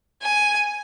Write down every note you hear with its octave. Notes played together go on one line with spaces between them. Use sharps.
G#5